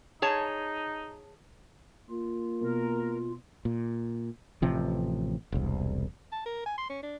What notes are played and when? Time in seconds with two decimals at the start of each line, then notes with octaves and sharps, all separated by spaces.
0.22 D#4 G#4 C#5 A5
2.10 A#3 F4
2.61 B2 A#4
3.65 A#2
4.62 A1 C3 F3
5.52 E1 C2
6.32 A5
6.46 A#4
6.66 G#5
6.78 C6
6.90 C#4
7.03 D4